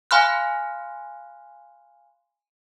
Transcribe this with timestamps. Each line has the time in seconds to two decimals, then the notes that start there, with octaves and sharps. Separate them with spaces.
0.11 F5 G#5 B5 C6 F6 F#6